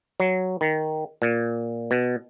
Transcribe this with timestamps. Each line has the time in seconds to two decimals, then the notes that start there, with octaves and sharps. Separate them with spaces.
0.20 F#3
0.61 D#3
1.22 A#2
1.91 B2